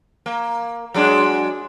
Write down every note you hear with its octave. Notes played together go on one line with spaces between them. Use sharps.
A#3
F#3 G#3 D4